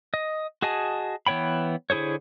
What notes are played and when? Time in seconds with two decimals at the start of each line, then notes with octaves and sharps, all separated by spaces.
0.14 D#5
0.62 F#4 G#4 D#5 G#5 A5
1.27 E3 B3 C#5 G5 B5
1.90 D3 E4 G#4 C5 C#5